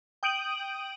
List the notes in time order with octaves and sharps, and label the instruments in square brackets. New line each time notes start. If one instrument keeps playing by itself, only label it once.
[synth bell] G5 D#6 G6 D7 D#7 F#7